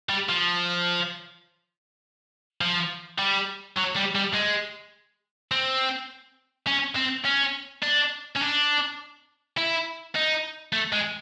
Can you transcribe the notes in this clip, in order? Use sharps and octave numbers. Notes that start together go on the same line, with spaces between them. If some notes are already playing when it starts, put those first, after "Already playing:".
G3
F3
F3
G3
F#3
G3
G3
G#3
C4
C#4
C4
C#4
D4
C#4
D4
E4
D#4
A3
G#3